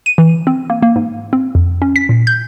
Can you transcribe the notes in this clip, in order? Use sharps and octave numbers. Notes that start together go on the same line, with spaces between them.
D#7
E3
C4
A#3
A#3
G#2
C4
F2
C#4
B6
A#2
G6